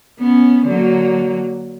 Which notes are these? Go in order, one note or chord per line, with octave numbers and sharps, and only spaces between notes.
B3 C#4
D3 F#3 A#3